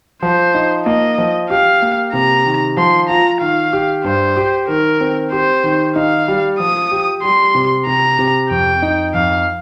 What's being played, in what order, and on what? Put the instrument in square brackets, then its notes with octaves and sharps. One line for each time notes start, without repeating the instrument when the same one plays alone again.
[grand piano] F3 [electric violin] C5
[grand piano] D#4
[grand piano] A#3 [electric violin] D#5
[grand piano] F3
[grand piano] G4 [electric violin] F5
[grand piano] A#3
[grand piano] C3 [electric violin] A#5
[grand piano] D#3
[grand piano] F3 [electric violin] C6
[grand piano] F4 [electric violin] A#5
[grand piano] D#3 [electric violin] F5
[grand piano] G4
[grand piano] G2 [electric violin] C5
[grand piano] G4
[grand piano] D#3 [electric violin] A#4
[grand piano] C4
[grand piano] G4 [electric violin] C5
[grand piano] D#3
[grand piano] D#4 [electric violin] F5
[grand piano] G3
[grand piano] F3 [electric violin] D#6
[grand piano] G4
[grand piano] G3 [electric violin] C6
[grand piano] C3
[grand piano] C3 [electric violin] A#5
[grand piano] C3
[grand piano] F2 [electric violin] G5
[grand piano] D#4
[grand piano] F2 [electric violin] F5